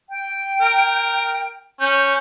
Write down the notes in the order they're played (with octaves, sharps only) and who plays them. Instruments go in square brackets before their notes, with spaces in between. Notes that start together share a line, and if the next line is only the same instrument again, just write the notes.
[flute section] G5
[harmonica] A#4
[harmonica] C#4 [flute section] G6